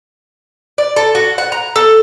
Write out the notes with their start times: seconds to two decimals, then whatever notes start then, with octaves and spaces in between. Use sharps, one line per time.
0.78 D5
0.96 A4
1.15 F#4
1.38 F#5
1.52 A#5
1.76 A4